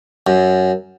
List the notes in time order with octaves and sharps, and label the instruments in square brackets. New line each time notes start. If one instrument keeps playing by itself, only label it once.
[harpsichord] F#2